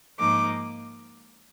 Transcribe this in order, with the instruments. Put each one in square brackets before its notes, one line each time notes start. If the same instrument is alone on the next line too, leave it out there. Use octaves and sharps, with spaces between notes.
[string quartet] G#2 F3 A#3 D#4 D6